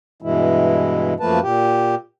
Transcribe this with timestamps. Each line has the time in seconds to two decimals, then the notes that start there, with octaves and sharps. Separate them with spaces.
0.22 G2 B2 E3 G#3 E4
1.20 F#2 F3 A3 A#3 B4 A5
1.42 A#2 G4